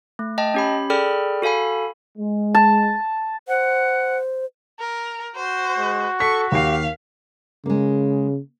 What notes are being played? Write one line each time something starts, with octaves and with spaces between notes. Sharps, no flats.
A3
D#5 G5 A5
C#4 G4 B5
G#4 A4 D5 G5 B5 F6
F#4 A4 F5 G#5 B5
G#3
A5
C5 F#5
A#4
F#4 C5
G#3
A4 C#6 B6
D#2 G4 F5 C7
C#3 G#3 A#3